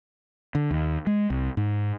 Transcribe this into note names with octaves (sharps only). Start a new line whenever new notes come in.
D3
D#2
G#3
C2
G#2